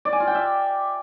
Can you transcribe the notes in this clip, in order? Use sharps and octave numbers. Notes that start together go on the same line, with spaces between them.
D5
G#5
F4
G5
E5